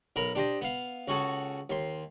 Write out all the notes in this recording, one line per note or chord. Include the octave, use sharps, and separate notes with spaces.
B1 A#4 B5
D4 G4 C5 D#5
B3 F5
C#2 F#4 G#4 A4
D#2 C6